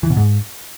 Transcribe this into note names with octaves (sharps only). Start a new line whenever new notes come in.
E3
B2
G#2